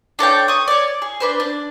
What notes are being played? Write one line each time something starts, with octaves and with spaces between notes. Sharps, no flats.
D4 A4 C#5 G5
C#6 D#6
C#5 D5
G#4
D4 B4 C5
D4